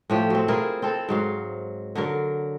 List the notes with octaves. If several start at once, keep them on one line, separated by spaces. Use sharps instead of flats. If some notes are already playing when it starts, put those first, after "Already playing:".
A2 F3 G4
F#3 C4
E4 F4 G#4 A#4
C4 A4
G#2 F#3 F5
D3 F#3 A#4